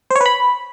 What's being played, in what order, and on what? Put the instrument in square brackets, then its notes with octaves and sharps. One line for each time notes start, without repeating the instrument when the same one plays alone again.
[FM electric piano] C5
C#5
B4
B5